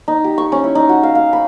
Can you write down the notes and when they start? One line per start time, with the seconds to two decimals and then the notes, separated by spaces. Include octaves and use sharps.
0.08 D#4
0.24 G4
0.38 C#6
0.52 C#4
0.64 E4
0.75 D#4
0.89 F#4
1.03 F5
1.15 F5
1.33 B5